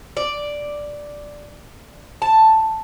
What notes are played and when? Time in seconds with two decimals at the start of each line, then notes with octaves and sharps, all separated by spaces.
0.17 D5
2.22 A5